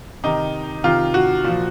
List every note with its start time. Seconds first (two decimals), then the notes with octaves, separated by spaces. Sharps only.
0.24 C3 D#3 D#4
0.84 C3 D#3 F4
1.14 F#4
1.44 A#2 F3